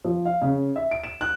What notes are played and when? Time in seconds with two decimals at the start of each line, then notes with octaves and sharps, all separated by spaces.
0.04 F3
0.25 F5
0.42 C#3
0.76 E5
0.91 D7
1.04 E7
1.21 F#6